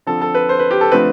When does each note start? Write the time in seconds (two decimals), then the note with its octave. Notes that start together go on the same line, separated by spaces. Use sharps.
0.07 D3 F3 C4 A4
0.21 A4
0.35 B4
0.49 C5
0.59 B4
0.71 G4
0.81 A4
0.92 D3 F3 A3 C4 B4